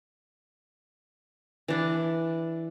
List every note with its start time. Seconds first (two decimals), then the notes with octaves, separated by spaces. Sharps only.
1.68 E3 D4